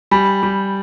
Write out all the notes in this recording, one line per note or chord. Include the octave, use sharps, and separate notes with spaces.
G3 G#5 B5
G3